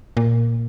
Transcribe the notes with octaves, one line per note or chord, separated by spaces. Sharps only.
A#2